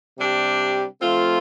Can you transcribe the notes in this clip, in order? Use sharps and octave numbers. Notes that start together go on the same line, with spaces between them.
C3 G3 D4 G4
F3 A3 C4 F4